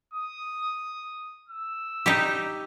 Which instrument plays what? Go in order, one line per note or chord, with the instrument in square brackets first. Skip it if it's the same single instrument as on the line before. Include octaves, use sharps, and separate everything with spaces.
[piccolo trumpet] D#6
E6
[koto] D#4 G4